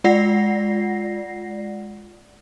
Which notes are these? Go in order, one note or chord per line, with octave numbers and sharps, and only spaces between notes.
G#3 F4 D5 F#5 A#6 C7